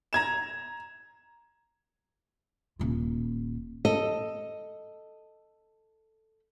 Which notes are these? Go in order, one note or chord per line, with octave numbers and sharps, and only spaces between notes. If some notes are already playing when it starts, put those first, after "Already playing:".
A#5 G#6 E7
D#1 F4
A4 D#5